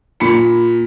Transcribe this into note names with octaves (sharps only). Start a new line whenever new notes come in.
A#2 B5 C#7